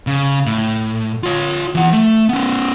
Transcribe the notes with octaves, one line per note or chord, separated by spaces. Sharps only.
C#3
A2
F4 C#5
E3 F#5
A3
B3 C#4